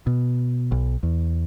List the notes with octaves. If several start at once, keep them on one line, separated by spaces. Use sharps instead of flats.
B2
B1
E2